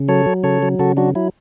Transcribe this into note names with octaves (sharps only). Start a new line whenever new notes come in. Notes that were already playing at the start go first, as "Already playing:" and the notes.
Already playing: C#3
F#3 A4 C#5
F#3
C#3 A4 C#5
F#3
C#3 F#4 A4
F#3 D4 F#4
F#3 E4